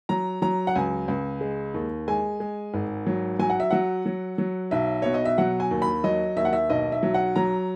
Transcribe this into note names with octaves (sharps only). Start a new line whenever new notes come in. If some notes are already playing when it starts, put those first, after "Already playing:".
F#3 A#5
F#3 A#5
F#5
C#2 G#5
C#2
G#3
D#2
G#3 G#5
G#3
G#1
F#3
F#3 G#5
F#5
E5
F#3 F#5
F#3
F#3
B1 E5
B2 C#5
D#5
E5
F#3 F#5
G#5
D#2
B5
F#3 D#5
D#2 E5
F#5
E5
B1 D#5
E5
F#3
F#5
F#3 A#5